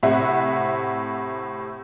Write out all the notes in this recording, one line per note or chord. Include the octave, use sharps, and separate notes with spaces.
A2 C3 E5 F#5